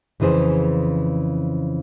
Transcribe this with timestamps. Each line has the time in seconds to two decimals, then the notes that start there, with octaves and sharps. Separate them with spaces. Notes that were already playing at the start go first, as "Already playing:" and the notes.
0.20 F2 C#3 E3 G#4 C5